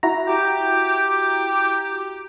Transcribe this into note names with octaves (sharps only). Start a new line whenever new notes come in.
E4 F#4 A#5
G4